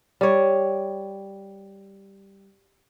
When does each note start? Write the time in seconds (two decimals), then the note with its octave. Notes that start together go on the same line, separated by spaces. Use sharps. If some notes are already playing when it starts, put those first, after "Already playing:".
0.21 G3 C#5